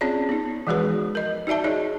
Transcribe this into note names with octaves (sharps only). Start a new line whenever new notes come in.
C4 C#4 F4 G#4 C#5 D5
B3 D#4
E3 F3 G#3 F#4 G#4 B4
A#4 D#5
D#4 F#4 D5 E5 A5
D#4 G#4 C#5 D#5